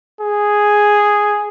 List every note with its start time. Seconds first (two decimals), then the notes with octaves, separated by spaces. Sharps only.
0.21 G#4